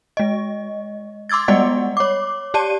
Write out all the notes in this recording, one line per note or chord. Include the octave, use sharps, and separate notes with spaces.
G#3 D#5
C6 D6 E6 G#6 A6
G3 G#3 B3 D5 D#5 F#5
C#5 D6
G4 D5 A5 D#7